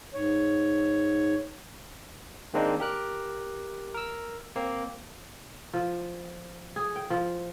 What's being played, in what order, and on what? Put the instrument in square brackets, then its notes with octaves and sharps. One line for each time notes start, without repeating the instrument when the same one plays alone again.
[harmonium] G#2 C#5
[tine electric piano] D#3 G#3 A#3 C4 D4 D#4
G4 A#4 F#6
A#4 E6
A#3 C4
[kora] F3
G#4
G5
F3